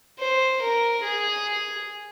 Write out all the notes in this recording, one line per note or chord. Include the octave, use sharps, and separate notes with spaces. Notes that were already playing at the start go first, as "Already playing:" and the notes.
C5
A#4
G#4